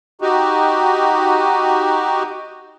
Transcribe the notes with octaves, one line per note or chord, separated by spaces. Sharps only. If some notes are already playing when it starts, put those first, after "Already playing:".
D#4 F#4 G4